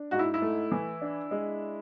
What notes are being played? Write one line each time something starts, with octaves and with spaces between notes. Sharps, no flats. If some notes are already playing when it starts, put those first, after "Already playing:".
Already playing: D4
G#2 F#4
E4
E4
A3
E3
D4
G#3